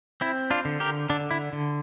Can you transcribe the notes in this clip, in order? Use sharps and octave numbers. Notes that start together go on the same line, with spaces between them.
C4 E4
D4 F4
D3
G4 A#4
D3 D4
E4
D3